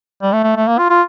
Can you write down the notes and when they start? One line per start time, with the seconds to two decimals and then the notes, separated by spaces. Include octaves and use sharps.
0.22 G3
0.33 A3
0.44 A3
0.56 A3
0.68 A#3
0.78 F4
0.90 F4